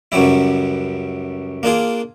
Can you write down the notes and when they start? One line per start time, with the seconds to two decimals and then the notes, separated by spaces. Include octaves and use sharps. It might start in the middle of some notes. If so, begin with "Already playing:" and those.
0.12 C#2 F#2 F#3 G3 E4
1.63 A#3 D4 F4 G#4